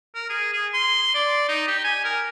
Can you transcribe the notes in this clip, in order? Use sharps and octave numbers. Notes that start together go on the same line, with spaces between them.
A#4
G#4
G#4
C6
D5
D#4
G4
G#5
A#4